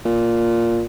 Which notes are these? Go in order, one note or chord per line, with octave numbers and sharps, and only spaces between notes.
A#2